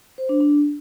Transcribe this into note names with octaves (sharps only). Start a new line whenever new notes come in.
C5
D4
D4